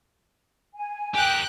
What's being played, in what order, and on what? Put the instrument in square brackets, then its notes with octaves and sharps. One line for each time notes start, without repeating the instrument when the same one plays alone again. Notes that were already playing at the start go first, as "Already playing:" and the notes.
[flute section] G#5
[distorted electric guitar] G4 A#4 [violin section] G5 F#6